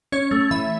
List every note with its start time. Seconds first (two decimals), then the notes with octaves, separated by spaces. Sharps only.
0.12 C#4 C#5
0.31 A3
0.51 E3 E5